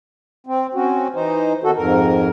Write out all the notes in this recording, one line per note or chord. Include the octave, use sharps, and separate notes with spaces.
C4
C4 C#4 F#4
E3 D#4 C5
B2 D#3 F#4 A4
F2 G#2 A#4